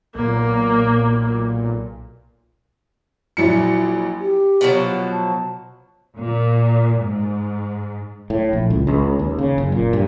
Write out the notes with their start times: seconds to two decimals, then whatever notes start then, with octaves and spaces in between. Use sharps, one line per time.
0.15 B1 A#2 A#3
3.37 A#1 F#3 E4 C#7
4.19 G4
4.61 B2 F3 F#3
5.11 A5
6.17 A#2
7.01 G#2
8.30 A2
8.53 A#1
8.70 C#2
8.87 C#2
9.19 D#2
9.38 C#3
9.58 F#1
9.72 A#2
9.93 G2